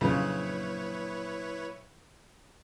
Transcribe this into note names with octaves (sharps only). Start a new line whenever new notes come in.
F2 A#2 C#3 F#3 D4 E4 B4 C#5